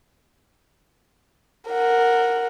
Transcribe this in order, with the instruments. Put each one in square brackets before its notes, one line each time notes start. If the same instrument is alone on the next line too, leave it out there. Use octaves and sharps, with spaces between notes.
[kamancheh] A#4 F#5